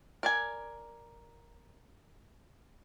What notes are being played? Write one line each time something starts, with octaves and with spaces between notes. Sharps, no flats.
A#4 D5 G#5